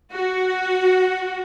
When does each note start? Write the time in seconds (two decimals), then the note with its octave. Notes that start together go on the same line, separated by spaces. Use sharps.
0.13 F#4